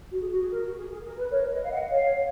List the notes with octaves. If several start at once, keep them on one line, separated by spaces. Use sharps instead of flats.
F#4
G#4
F#4
G#4
A#4
F#4
G#4
G#4
A#4
B4
A#4 C#5
B4 D#5
F5
D#5 F#5
C#5 F5